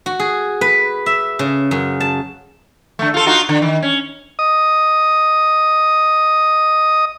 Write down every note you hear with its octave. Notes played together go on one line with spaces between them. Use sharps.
F#4
G#4
B4
E5
C#3
F#2
A5
D3 A3
F4 A4
D#4 F4 F#4
D3
D#3
C#4
D#5 D#6